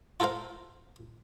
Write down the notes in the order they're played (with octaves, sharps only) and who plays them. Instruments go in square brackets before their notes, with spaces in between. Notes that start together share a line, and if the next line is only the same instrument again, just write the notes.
[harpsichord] F4 A4 A#4 C5 F5